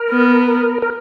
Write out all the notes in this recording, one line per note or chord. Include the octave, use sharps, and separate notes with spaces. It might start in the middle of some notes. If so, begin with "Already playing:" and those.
Already playing: A#4
B3
A#4